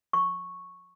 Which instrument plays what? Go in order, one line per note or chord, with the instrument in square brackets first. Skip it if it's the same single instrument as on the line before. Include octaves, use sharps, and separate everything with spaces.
[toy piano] C#6